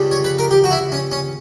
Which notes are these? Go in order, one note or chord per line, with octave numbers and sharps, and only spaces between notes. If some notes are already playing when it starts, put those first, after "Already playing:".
Already playing: C#2 C#3 G3
C#5
B4
A#4
G4
F#4
E4
C#4
C#4